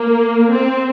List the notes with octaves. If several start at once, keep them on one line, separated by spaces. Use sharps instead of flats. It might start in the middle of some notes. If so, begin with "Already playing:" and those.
Already playing: A#3
C4